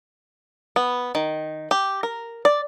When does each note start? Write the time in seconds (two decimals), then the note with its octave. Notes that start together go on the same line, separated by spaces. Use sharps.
0.76 B3
1.15 D#3
1.71 G4
2.03 A#4
2.45 D5